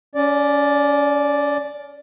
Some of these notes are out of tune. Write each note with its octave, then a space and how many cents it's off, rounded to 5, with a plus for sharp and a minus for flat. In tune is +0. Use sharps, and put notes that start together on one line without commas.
C#4 +30 D5 +0